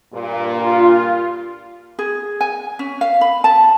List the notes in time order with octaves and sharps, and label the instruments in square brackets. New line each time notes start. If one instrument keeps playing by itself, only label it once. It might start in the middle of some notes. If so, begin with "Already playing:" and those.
[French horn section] G2 A#2
[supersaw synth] F4
[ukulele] G#4
G#5
C#4
F5
B5
A5